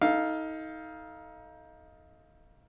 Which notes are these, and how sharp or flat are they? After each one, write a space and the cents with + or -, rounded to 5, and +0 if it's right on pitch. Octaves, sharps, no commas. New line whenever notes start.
D#4 +25 A4 +0 F5 +0